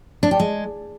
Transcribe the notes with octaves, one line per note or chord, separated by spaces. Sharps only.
D4
G4
G#3